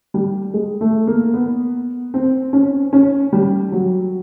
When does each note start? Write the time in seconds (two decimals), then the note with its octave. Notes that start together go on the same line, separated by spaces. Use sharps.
0.14 G3
0.54 G#3
0.81 A3
1.07 A#3
1.33 B3
2.14 C4
2.53 C#4
2.93 C#4
3.33 G3
3.72 F#3